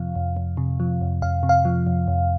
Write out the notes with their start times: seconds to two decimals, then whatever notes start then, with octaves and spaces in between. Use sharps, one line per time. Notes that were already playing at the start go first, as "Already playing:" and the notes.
Already playing: F2 C3 F3 F5
0.16 F2
0.37 F2
0.57 C3
0.80 F3
1.01 F2
1.22 F2 F5
1.43 C3
1.49 F5
1.65 F3
1.87 F2
2.08 F2